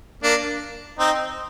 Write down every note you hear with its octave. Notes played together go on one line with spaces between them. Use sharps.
A#3 D4
C4 D#4